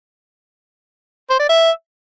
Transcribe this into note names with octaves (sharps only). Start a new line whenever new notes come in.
C5
D5
E5